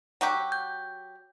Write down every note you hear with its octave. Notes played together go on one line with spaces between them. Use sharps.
F#3 F#4 G4
G6